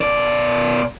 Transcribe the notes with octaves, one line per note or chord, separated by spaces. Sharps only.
B2 D5